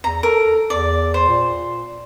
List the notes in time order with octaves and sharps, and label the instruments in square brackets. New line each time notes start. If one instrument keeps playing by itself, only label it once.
[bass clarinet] E2 [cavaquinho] A#5
[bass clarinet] A4 [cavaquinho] A#4
[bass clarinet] E2 [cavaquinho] D5
[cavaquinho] C5
[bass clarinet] A#2